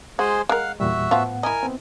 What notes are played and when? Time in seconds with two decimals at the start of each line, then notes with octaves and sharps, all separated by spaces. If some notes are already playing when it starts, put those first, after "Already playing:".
0.19 G#3 F#4 G#4 C5
0.49 G#3 A#4 F5 F#5
0.80 E2 A#2 G3 F#4 E5
1.11 A2 F3 B3 F4 F#5
1.43 E4 A#4 D#5 G#5
1.63 B3 C4